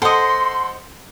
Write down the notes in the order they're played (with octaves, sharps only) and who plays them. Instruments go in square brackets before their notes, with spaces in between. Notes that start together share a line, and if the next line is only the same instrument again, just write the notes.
[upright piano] A4 F#5 [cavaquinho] C5 D#5 [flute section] C6